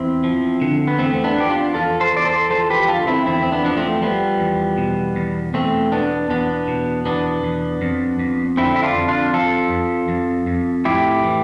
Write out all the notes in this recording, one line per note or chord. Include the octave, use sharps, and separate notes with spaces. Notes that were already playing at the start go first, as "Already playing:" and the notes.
Already playing: E2 C4 E4
F3
D3
B3
E2 A3 C4
C4
B3 D4
F3 G4
D4 F4
E2 F4 A4
A4 C5
E2 D5
A4 C5
F3 A4 C5
G4 B4
D3 F4 A4
C4 E4
E2 C4 E4
C4
B3 D4
F3 D4
A3 C4
F3 G3 B3
E2
B2
E2
E2 A3 C4
B2 B3 D4
E2 B3 D4
B2
E2 B3 D4
E2
F2
F2
D3 C4 E4
E4
D4 F4
F2
D4 F4
F3 F4 A4
F2
F2
F2
A2 E4 G4
E3